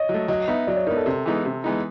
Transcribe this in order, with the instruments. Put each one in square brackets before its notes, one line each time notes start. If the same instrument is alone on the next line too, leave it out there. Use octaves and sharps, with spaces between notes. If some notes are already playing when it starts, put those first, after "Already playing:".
Already playing: [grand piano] C#5 D#5
[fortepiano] F#3
A3
[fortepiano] F#3 [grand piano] D#5
[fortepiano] B3 D#4 [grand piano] E5
[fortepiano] F#3 [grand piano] D5
[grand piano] C#5
[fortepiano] B3 D#4 [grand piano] A#4
[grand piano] A4
[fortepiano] C3
E3 G#3 B3 D#4
C3
E3 G#3 B3 D#4